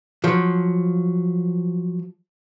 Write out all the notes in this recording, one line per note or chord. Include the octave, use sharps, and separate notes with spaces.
F3 F#3